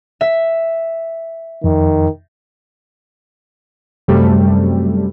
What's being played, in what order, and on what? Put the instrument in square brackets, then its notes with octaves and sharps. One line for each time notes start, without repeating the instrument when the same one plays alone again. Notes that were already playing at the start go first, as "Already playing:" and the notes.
[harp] E5
[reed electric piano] F2 [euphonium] D#3
[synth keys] F#2 C3 G3 A3